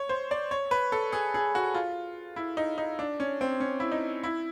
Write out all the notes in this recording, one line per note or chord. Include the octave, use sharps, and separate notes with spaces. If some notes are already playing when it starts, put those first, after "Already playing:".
Already playing: C#5
C5
D5
C#5
B4
A4
G#4
G#4
F#4
F4
E4
D#4
D#4
D4
C#4
C4
C#4
E4
D#4
E4